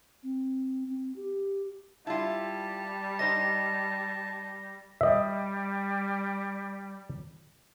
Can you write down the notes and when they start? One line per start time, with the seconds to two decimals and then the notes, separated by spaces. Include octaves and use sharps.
0.23 C4
0.87 C4
1.16 G4
2.07 G3 E4 F4 A5
3.19 D#4 C5 D#5 A#6
5.01 G3 D#5 E5